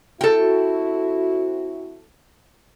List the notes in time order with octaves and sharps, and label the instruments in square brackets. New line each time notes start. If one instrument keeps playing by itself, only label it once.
[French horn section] C4 E4 F#4 [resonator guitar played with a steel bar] A4 G5